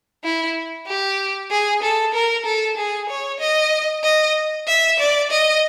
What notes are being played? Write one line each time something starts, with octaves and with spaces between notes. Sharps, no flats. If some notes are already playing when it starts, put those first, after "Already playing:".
E4
G4
G#4
A4
A#4
A4
G#4
C#5
D#5
D#5
E5
D5
D#5